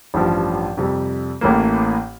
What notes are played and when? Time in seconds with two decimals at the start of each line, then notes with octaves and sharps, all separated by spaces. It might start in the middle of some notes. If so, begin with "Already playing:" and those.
0.14 A1 G2 F3
0.77 F2 C3 G3
1.41 A1 A2 E3 A#3